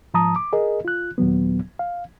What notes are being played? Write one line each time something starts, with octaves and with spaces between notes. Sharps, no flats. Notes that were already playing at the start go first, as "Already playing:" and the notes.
G#2 F3 A5 A#5 D#6
D6
G#4 A#4 D#5
F4 F#6
D#2 A#2 F#3 B3
F5